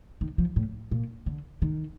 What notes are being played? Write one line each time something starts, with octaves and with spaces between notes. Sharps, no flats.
D#3
F3
A2
A#2
D3
D#3